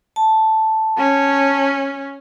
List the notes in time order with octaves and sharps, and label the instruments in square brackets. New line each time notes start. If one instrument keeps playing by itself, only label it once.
[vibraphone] A5
[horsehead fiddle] C#4